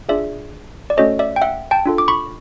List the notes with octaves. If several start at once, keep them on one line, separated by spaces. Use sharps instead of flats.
D4 F4 G#4 D5 E5
D5
A3 C#4 F#4 A4 C#5 D#5
D5 E5
G5
E5 F#5
G5 A5
D4 F4 A4
D6
B5 C#6